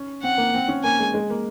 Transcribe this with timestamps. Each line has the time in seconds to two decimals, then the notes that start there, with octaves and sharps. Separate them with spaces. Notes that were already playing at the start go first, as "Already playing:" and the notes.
Already playing: C#4
0.23 C4 F#5
0.37 A#3
0.54 C4
0.68 C#4
0.83 A#3 G#5
0.99 G#3
1.14 G#3
1.30 A#3